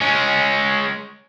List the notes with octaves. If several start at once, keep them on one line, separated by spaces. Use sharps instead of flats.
G#3 C#4